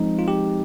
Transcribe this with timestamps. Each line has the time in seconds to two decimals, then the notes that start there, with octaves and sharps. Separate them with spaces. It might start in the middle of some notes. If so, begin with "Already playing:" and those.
Already playing: F3 G#3 C4 D#4
0.19 F4
0.28 G4